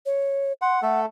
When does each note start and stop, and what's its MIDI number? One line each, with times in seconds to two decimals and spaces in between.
0.06 0.53 73
0.62 0.81 78
0.62 0.79 84
0.82 1.06 57
0.82 1.06 69
0.82 1.01 78